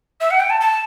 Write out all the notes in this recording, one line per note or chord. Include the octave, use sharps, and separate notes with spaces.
E5
F#5
G5
A5
A5